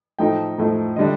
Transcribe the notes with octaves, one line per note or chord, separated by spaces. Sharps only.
A2 F3 A3 D#4 G5
A2 F3 A3 D#4
D3 G3 D4 D#5